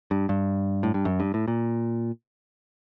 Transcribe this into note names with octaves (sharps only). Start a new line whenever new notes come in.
G2
G2
A2
G2
F#2
G2
A2
A#2